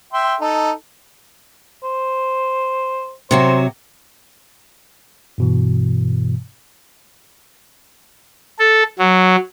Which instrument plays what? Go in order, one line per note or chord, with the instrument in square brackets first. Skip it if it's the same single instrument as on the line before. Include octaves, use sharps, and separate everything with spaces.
[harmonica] E5 G5 C6
D#4 A4
[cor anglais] C5
[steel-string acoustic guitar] C3 F#3 F#4 [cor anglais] C5
[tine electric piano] G2 B2 E3
[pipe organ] A4
F#3